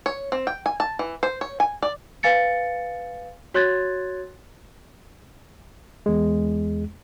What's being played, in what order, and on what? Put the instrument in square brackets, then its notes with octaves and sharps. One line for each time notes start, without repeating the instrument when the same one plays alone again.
[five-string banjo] C#5
C4
G5
G#5
A5
E3
C5
C#5
G#5
D5
[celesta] B4 F5 G#5 A6 C#7
F#4 C#5 C6 F#6 G#6 A6
[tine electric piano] E2 G#3